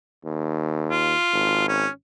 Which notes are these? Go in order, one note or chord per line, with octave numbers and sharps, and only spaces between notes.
D#2
F4
G#1
C#4